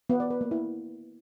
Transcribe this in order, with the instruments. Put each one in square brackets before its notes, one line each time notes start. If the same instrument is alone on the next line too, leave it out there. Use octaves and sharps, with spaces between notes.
[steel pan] B3
D5
B4
A#3
E4